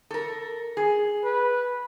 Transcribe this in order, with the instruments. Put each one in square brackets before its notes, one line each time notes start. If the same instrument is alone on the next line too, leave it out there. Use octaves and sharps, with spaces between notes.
[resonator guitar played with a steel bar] A4 A#4
G#4
[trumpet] B4